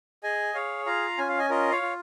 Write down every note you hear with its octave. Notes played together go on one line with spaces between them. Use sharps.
G#4 D#5 G#5
G#4 C#5 F5
F4 F5 A#5
C#4 G#5
F5
D#5 G#5
F4 A#4 D#5
C#5 F5
F4